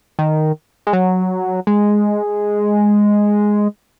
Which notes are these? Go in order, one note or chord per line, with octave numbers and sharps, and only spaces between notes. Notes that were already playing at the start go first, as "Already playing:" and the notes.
D#3
G#3
F#3
G#3